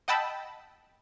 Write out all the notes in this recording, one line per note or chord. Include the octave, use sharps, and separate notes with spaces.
D#5 F#5 G5 A5 B5 E6